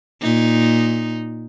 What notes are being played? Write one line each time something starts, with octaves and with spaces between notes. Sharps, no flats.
A#2 D#4